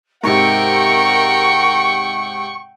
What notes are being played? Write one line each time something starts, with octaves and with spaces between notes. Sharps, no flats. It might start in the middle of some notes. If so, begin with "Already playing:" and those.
G#2 C3 A#4 F#5 G5 C#6